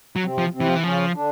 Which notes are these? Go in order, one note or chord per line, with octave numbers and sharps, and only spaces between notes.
F#3
C3 C4
F3
C3 C4
E3
F3
E3
C#3 F3 C#4
D3 D4